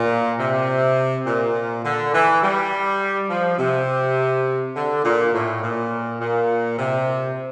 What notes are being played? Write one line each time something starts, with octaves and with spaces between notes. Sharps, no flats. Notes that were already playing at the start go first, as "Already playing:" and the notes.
Already playing: A#2
C3
A#2
D3
E3
G3
F3
C3
D3
A#2
A2
A#2
A#2
C3